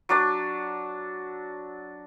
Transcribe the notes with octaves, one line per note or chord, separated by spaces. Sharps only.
F#3 D4 D5